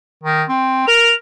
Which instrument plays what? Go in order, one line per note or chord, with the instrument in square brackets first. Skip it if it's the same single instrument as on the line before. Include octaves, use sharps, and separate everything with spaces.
[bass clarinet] D#3
C4
[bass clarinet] A#4 [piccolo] F7